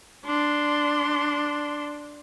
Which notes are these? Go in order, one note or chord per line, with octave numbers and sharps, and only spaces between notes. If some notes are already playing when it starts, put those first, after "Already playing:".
D4 C6